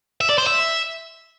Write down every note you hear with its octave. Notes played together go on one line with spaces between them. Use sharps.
E5
D5
C5
E5